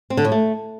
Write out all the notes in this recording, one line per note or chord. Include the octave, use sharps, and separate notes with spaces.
C4
D3
A2
A3